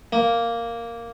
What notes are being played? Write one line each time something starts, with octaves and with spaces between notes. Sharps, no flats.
A#3